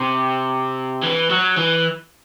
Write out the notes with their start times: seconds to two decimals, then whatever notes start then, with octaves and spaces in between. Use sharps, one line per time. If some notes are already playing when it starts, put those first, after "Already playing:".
Already playing: C3
1.03 E3
1.30 F#3
1.57 E3